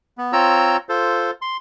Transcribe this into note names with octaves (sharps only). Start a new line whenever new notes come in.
B3
C4 F4 C#5 A#5 E6
F4 A4 C5
C6